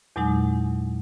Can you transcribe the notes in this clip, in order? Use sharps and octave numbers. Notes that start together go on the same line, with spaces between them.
E2 A#2 F#3 G#3 D#4